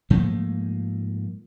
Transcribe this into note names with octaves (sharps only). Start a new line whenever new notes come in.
G#2 F3 A3 A#3